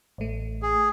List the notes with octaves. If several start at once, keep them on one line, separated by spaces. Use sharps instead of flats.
A1 A3
G#4